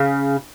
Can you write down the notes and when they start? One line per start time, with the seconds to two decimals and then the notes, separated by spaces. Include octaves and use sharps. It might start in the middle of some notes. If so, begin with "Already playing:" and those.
Already playing: C#3